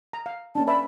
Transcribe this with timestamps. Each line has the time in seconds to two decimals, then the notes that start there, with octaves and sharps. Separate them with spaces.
0.13 A#5
0.26 F5
0.55 A#3 C#4 D4 A5
0.67 B4 D5 E5 B5